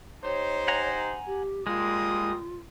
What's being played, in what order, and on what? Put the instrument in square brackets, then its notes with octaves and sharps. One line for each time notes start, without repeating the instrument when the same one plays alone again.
[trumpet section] D#4 G4 C5 [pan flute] C#5
[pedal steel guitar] F#5 G#5 A#5
[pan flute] G4
[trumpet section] G3 A#3 D#6 [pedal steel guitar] G#3 [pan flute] F4